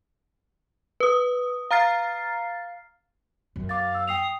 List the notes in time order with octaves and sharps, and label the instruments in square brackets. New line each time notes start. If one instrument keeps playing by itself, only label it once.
[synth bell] B4 D#6
F5 A#5 F6 A6 C7
[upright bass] F#2
[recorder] F5 [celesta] D6 A6
[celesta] E6
[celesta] G5 C7 F7 [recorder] D#6